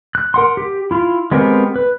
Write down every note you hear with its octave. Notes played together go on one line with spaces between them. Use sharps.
F#6
A#4 F#5 C6
G4
E4 F4
G#3 B3 C4 G4 A#4
B4